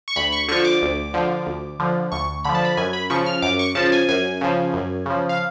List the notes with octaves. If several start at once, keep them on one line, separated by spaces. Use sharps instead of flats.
C#6
D2 B5
C#6
D3 F3 C#6
D6
D2
D3 F3
D2
D3 F3
D2 C#6
D3 F3 B5
A5
B5
F#2 G#5
B5
C#3 F3 C#6
F6
F#2 D6
C#6
C#3 F3 A5
G#5
F#2 G#5
C#3 F3
F#2
C#3 F3
F5